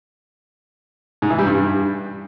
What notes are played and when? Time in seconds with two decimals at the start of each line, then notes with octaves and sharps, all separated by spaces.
1.22 G#2
1.30 E3
1.39 G3
1.47 G2